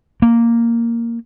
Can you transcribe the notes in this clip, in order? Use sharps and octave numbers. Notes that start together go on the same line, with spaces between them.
A#3